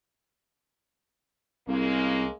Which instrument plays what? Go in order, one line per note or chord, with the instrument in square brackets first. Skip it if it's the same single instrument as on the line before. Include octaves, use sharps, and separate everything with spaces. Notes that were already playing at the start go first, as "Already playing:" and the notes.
[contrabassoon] C2 [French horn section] C#3 G#3 A#3